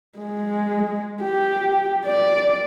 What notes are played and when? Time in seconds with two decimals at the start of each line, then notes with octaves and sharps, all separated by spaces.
0.19 G#3
1.23 G4
2.06 D5